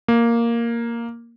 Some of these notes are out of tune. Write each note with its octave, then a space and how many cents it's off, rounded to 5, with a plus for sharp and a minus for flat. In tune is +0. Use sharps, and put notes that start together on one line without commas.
A#3 +0